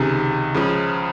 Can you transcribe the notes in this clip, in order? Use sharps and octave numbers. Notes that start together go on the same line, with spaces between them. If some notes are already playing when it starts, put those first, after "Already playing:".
Already playing: C#2 C3 D#3 G#4
C#2 C#3 F3